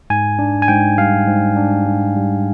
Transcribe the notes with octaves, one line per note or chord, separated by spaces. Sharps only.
G#2 G#5
D4
G#5
G#2 G5
G3 F5
G#2
D4
G#2
G3